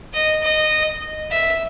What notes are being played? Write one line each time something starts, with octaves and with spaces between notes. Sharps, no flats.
D#5
D#5
E5